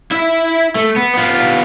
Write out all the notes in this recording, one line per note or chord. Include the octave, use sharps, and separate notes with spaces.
E4 E5
A3
B3
B3 F4